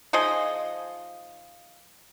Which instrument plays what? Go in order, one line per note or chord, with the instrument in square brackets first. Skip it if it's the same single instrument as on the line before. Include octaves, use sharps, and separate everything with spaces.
[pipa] F3 D#4 G#4 D#5